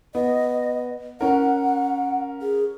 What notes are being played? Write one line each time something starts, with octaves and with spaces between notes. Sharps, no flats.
B3 D#5
C#4 A#4 F#5
G#4